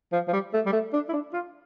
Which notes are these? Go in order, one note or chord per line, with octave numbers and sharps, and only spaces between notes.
F3
F3
G3
A3
G3
A3
D4
E4
D4
F4